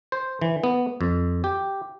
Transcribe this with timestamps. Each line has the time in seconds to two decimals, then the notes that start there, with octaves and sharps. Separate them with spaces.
0.12 C5
0.41 E3
0.64 B3
1.01 F2
1.44 G4